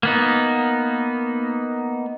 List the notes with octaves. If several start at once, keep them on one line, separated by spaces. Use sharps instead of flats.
A#3 B3 D#4